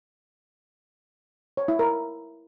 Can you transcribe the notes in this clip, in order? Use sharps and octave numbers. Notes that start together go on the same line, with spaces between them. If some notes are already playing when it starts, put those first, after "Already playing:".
C#5
E4
A#4